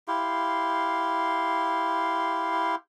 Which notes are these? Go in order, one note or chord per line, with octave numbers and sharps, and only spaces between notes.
E4 G4 F5 C6